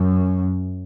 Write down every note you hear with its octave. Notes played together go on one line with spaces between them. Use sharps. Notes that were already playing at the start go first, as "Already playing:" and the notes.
Already playing: F#2